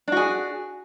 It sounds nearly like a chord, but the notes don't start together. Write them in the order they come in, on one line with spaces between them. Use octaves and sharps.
D4 F#4 G#4